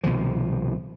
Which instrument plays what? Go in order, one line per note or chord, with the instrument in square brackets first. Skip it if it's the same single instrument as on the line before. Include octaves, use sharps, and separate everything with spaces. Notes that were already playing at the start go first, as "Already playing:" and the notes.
[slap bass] C2 B2 D#3 F3